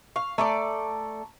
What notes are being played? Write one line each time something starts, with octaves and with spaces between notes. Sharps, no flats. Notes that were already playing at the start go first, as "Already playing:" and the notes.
F5 C#6
A3 A4 D5 A5 A#5 C#6